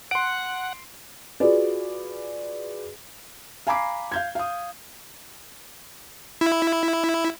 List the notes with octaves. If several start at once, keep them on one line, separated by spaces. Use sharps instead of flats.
F#5 C6 D7
F4 F#4 G#4 B4 D5
F5 G#5 A#5 B5 D6 C7
F5 G6 G#6
F5 D#6
E4